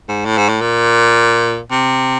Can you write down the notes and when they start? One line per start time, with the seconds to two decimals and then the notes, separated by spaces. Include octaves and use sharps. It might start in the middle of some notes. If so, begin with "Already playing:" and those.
0.08 G#2
0.25 A2
0.37 G#2
0.48 A2
0.61 A#2
1.71 C3